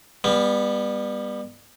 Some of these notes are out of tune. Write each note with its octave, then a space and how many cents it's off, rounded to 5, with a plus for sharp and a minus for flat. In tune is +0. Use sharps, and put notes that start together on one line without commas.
G3 +30 B3 -10